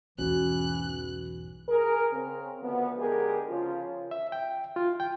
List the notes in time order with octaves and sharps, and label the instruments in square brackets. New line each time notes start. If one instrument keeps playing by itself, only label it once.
[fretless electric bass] B1 E2 G#2 [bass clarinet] E3 [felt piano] C#4 F#4 [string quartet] F#6
[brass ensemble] G#4 A#4
C#3 C4
D2 F3 B3
D3 G#3 G4 G#4 A#4
C#3 F3 C#4 F4
[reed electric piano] E5
G5
F4
G5